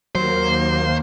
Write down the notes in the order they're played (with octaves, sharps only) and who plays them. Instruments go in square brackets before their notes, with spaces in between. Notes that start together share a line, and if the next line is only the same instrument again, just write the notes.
[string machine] D#2 A#3 [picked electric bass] F#3 [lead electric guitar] C5